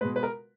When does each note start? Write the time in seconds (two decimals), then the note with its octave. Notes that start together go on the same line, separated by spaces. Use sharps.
0.01 B2 G#3 B4
0.16 B4
0.23 A#4